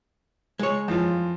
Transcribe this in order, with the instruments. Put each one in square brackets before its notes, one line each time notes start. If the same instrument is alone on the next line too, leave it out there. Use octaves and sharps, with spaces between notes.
[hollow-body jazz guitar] G#3 C#5
[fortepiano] F2 E3 F4